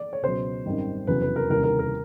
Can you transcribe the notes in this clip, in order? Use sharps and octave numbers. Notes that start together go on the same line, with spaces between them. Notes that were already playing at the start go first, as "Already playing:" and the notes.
Already playing: D5
C#5
C#2 B2 F#3 C5
G#1 F#2 D#3 G3
F1 E2 C#3 F#3 B4
B4
A#4
F1 D#2 C#3 E3 G3 A#4
A#4
A#4